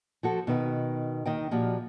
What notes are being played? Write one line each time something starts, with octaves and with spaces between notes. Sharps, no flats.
F3 F#4 A4
B2 D#3 B4 D#5
D#2 D#3 D#5 G5
A#2 F3 F#4 G4